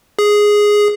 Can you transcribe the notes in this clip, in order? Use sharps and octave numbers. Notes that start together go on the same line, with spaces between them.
G#4